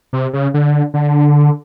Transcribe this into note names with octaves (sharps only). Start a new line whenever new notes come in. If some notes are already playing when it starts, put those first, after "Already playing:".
C3
C#3
D3
D3